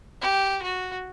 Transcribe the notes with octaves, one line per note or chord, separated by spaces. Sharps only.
G4
F#4